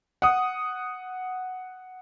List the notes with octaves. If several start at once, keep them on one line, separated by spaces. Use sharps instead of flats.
F#5 D#6